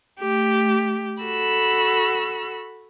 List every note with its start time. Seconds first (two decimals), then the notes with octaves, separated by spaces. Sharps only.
0.19 A3 G4
1.24 F#4 A4 B5 E6